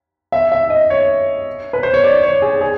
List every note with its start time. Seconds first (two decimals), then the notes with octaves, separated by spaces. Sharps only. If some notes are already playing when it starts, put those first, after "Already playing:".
0.32 E5
0.52 E5
0.70 D#5
0.90 C#5
1.73 B4
1.83 C5
1.94 C#5
2.04 D5
2.23 C#5
2.42 G#4
2.61 G#4